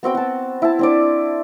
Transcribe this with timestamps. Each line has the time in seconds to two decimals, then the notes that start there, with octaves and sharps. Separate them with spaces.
0.03 B3 C4 F#4 G5
0.15 F#4 A5
0.62 E4 A5
0.79 C4 D4 D5